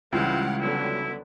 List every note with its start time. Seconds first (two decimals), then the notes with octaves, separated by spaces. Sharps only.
0.13 C#2 C#3 E3 G3 C4 F5 F#5
0.61 D3 F#3 B3 E4